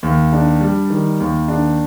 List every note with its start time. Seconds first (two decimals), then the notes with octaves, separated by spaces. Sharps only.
0.03 D#2
0.33 D4
0.61 G3
0.90 D#3
1.20 D#2
1.48 D4